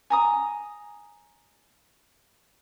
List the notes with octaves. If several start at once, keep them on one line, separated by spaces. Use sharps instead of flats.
G#5 A#5 D#6